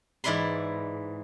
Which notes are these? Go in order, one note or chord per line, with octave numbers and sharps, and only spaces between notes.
G#2 E3 E4 D5 B5 C6